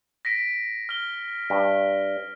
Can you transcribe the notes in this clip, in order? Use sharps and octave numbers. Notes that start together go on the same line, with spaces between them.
A#6 B6 D7
F6 G7
G2